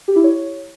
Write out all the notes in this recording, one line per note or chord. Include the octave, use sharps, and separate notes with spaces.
G4
E4
C#5